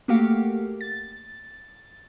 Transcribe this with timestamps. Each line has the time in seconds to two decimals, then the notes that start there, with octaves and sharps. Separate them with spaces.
0.08 A3 A#3 F#4 G4 F5
0.81 A6